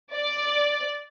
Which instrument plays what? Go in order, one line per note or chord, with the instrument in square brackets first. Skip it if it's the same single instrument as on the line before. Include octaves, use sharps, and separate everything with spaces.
[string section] D5